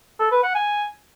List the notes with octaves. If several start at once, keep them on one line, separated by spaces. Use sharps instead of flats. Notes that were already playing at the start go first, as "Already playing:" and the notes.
A4
B4
F#5
G#5